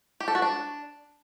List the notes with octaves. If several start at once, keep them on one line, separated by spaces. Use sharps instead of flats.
G4
A4
F#4
D4